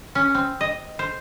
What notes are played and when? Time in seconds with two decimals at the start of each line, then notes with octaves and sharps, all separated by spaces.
0.15 C#4
0.35 C4
0.61 D#5
0.99 C5